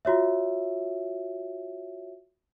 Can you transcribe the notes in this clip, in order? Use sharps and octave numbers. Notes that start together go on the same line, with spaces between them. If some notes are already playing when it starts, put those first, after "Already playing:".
F4 F#4 C#5 E5